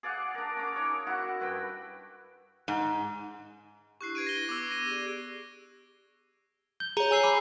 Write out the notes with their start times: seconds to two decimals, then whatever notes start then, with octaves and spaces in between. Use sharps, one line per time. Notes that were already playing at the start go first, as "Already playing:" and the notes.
0.03 G#4 D5 F5 F#5
0.35 D4 A#4
0.57 C#4 D6
0.76 D#4 C#5
1.07 E4 F#4 F#5
1.40 G2 B4 G5
2.68 G#2
4.01 D4 E4 G4 C#6 F#6 C7
4.15 D4 B4 G#6 D7 D#7
4.26 A#6 G7
4.49 B3 D6 E6
4.70 A#6 D#7
4.86 G4 G#4 D5
6.80 G6 G7
6.97 G#4 C#5 A#5
7.11 G#5 E6 C7
7.23 B5 D6 E6